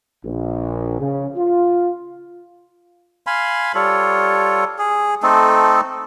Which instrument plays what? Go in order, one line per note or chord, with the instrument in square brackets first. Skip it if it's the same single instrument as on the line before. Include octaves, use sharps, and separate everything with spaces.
[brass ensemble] A#1
C#3
F4
[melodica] F5 G#5 B5 C6
G3 F4 A4 C#5
G#4
A3 C4 D#4 A4